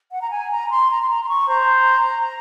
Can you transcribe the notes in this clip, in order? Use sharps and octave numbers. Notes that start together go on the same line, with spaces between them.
F#5
A#5
G#5
A#5
C6
A#5
C6
A#5
C6
C#6
C5 A#5